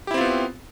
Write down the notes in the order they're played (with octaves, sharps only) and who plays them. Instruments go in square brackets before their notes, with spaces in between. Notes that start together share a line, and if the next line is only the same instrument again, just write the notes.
[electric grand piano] G4
E4
C4
F4
B3